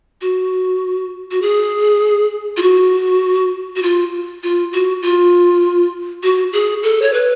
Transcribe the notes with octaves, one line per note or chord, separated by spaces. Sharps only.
F#4
F#4
G#4
F4
F#4
F#4
F4
F4
F#4
F4
F#4
G#4
A4
C#5
B4